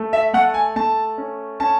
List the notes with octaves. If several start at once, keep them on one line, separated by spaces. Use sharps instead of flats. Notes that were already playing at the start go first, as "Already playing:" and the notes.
Already playing: A3
E5
A3 F#5
G#5
A3 A5
C#4
C#4 A5